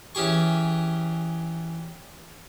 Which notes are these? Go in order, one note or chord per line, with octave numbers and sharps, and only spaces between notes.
E3 C#4 G4 G#4 C#6